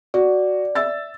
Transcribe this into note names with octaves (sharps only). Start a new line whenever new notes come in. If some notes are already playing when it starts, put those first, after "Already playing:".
F#4 D5
E5 E6 A6